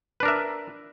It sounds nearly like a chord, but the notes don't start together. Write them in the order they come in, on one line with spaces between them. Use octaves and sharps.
B4 D4 A#4 E5